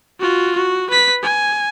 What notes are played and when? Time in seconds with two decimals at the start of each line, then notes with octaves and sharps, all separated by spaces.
0.20 F4 F#4
0.55 F#4
0.90 B4 B6
1.22 G#5